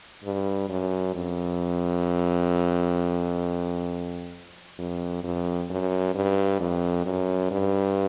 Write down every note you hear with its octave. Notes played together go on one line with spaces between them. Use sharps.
G2
F#2
F2
F2
F2
F#2
G2
F2
F#2
G2